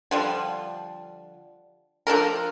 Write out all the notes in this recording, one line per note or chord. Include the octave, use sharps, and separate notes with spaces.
D3 F3 G3
F3 D4 A4 A#4